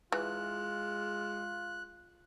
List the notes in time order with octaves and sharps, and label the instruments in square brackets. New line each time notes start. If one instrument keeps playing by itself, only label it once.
[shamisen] E3 [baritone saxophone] G#3 [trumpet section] F4 [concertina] F#6